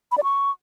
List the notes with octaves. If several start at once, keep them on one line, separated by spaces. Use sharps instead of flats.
B5
D5
C#6